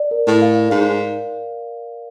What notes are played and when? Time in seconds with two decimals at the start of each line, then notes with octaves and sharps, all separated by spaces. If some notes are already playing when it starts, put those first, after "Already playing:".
Already playing: D5
0.11 A#4
0.27 A2
0.42 F5
0.70 G#2 F5